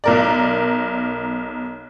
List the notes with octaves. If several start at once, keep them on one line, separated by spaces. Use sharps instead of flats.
B1 A#4 D5